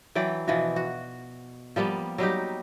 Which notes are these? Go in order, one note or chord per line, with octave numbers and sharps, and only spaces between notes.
E3 F#3 D5 G5
B2 E3 F3 F#4
F#4
F3 G3 A#3 B3
F#3 G3 D#4 G4